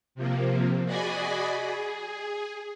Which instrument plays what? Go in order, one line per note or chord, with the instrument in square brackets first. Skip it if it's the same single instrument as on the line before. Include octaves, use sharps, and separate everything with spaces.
[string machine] C3 F3 A#3
F#4 G#4 D5 D#5 G#5 B5
G#4